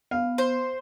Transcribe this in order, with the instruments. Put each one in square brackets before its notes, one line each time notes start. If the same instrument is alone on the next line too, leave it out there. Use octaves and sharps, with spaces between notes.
[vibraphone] B3 [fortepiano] F5
[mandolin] C5